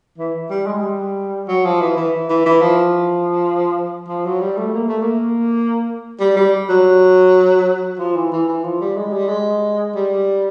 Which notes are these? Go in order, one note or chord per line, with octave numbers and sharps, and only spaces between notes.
E3
G3
G#3
G3
F#3
F3
E3
E3
E3
E3
F3
F3
F#3
G3
A3
A#3
A3
A#3
G3
G3
F#3
F3
E3
E3
E3
F3
G3
G#3
G3
G#3
G3